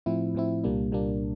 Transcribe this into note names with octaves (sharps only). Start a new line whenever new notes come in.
A2 F3 C4 E4
A2 F3 C4 E4
C2 A#2 G3 A#3 D4
C2 A#2 G3 A#3 D4